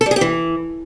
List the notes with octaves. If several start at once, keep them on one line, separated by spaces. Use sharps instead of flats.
A4
G3
G#4
G4
E3